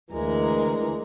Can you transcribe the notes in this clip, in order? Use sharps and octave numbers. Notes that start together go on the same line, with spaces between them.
D2 E3 G#3 A#4